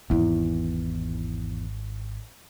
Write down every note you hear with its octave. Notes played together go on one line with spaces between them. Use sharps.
G#1 E2 E4